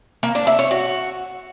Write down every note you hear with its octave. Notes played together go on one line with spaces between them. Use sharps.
A#3
D4
E5
C#5
F#4